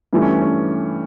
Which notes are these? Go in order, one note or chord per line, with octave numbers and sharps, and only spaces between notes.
G2 E3 A3
C#4
C#4